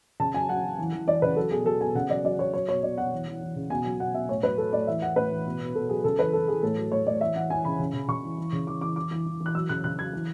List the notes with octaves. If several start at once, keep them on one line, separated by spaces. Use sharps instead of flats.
C#3 A5
F#3 G#5
F#3 F#5
F#3
E3
E3
E3 D5
C#3 B4
F#3 A4
B2 G#4
F#3 A4
B2 G#5
C#3 F#5
F#3 D5
F#3 D5
F#3 C#5
F#3 C#5
B2 C#5
B2 D5
B2 F#5
E3
E3
E3
C#3
B2 G#5
F#3 G#5
B2 F#5
B2 E5
A2 C#5
F#3 B4
F#3 A4
A2 D5
E3 E5
E3 F#5
A2 B4
E3
B2
B2
B2 A4
F#3 G#4
C#3 A4
E3 B4
E3 A4
E3 G#4
A2 A4
F#3
A2 C#5
A2 D5
E3 E5
E3 F#5
E3 G#5
C#3 B5
C#3
C#3
C#3 C#6
E3
E3
C#3
E3 D6
E3 D6
E3 D6
E3
E3
E3
F#6
F#3 E6
C#3 F#6
C#3 F#6
F#3 G#6
E3